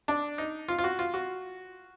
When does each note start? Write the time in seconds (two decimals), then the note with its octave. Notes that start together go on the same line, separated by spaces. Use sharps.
0.08 D4
0.38 D#4
0.68 F4
0.79 F4
0.84 F#4
0.99 F4
1.14 F#4